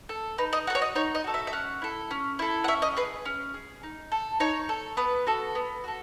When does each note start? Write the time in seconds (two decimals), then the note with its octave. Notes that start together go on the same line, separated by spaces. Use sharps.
0.09 A4
0.38 D#4 B4
0.53 D#5
0.67 F#4 F#5
0.70 A4
0.75 C#5
0.82 D#5
0.95 D#4 C#5
1.15 D#5
1.24 F#4 A4
1.34 E5
1.47 E5
1.53 C#4 F#5
1.82 E4 A4
2.11 C#4
2.39 E4 A4
2.64 F#5
2.68 C#4 E5
2.82 D#5
2.97 G#4 B4
3.25 C#4
3.54 G#4
3.83 D#4
4.12 A4
4.40 D#4 C#5
4.69 A4
4.97 B3 B4
5.27 F#4 A4
5.55 B3
5.84 F#4 A4